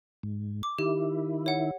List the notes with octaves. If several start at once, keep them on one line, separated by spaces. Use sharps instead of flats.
G#2
D6
D#3 E4 G4
C#5 F#5